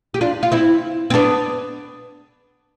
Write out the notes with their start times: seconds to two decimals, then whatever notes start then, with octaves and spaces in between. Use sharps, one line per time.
0.14 G4
0.21 D4 F4
0.43 F4
0.52 C4 E4
1.10 C4
1.14 B3 D4